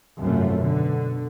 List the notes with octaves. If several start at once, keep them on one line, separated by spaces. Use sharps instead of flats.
G#1 F#2 C3 F3 A3
B2 D3